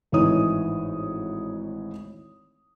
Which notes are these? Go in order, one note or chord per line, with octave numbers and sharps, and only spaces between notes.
G#1 A2 E3 D#4 C#5 D#6